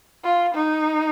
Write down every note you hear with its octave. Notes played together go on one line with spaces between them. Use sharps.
F4
D#4